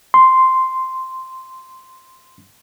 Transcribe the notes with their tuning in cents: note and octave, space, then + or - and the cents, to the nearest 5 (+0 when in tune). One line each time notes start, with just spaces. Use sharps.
C6 -5